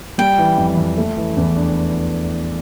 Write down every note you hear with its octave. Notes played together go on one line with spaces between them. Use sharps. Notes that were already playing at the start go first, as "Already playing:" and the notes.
G3 G5
E3
F2
F2
A3
E3
E2
D4